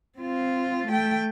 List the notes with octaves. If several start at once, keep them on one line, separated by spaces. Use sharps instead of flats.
C4 F4
A3 G5